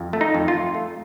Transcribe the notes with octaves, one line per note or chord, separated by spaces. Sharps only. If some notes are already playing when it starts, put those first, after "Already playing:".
Already playing: F2
A3
D#4
F2
F4
F2
A3